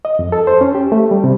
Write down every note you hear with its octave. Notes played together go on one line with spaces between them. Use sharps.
D#5
F2
A4
C5
C#4
G4
A3
G3
C3